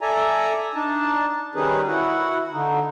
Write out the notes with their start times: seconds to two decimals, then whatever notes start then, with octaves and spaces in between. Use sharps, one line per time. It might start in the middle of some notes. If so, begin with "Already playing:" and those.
0.01 A4 D5 E5 G#5 A#5
0.75 D4 D#4 A5
1.55 D#3 G3 C#4 D#4 G#4 B4
1.88 E4 F#4 F#5
2.53 D3 D#4